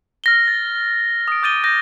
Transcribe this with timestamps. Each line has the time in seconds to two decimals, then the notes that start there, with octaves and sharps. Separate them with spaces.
0.24 F6 A#6 G7
0.48 A6
1.28 D#6 D7
1.43 D6 G6 A6 D#7 G7
1.64 G6 A#6